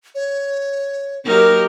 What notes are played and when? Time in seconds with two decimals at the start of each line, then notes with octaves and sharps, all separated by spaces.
0.15 C#5
1.25 F#3 A#3 D#4 G4 A#4